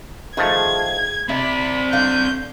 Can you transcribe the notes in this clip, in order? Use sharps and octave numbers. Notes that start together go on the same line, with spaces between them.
D#3 F3 A3 G#4 G#6
C3 C4 D5 E5 B5
D3 F5 G6